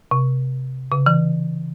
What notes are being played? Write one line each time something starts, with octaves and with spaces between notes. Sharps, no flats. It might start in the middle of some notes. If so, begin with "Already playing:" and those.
C3
C#3
E3